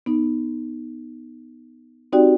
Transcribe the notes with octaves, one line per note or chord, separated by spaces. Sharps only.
B3 D#4
C4 D#4 F#4 G4 D5 G5